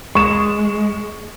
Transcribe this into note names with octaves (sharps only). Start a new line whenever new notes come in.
G#3 C#6 E7